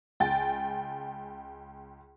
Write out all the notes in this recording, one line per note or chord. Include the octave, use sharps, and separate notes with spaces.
C#2 G5 G#5 A6